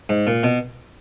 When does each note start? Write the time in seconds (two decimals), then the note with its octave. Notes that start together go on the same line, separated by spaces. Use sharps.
0.09 G#2
0.27 A#2
0.43 B2